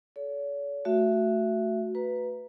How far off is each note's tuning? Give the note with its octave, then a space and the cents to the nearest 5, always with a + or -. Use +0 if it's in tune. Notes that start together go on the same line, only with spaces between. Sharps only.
A4 -30 C#5 +40
A3 +0 F#4 +0 E5 +20
B4 +0 A#5 +10